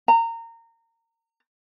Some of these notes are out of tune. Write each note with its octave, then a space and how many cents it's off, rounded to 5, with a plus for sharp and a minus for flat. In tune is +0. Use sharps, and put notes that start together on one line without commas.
A#5 -25